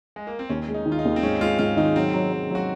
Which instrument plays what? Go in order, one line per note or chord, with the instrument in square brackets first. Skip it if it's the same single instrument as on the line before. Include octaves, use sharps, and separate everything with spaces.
[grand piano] G#3
A#3
C4
[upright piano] D#2 [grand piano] C#4
[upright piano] G#3
[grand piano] D#4
[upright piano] D#3
[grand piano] F4
D#4
[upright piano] D#2
[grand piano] C4
[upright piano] G#2 [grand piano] C#4
[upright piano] G#3 [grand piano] F4
[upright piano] G#2 [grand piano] F4
[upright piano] D#3 [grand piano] D#4
[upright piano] F#3 [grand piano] C4
[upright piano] F#3
F#3
[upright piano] F#3 [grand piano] F#4